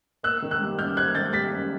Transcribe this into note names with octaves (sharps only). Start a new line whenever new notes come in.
A#3 E6 F#6
D#3
E6 F#6
G3
F#2 F6 G6
A#3 F#6 G#6
D#3 G6 A6
G3 A6 B6
F#2